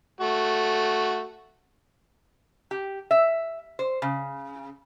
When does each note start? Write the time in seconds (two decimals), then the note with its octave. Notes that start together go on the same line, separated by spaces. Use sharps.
0.21 A3 F#4
2.71 G4
3.11 E5
3.79 C5
4.02 C#3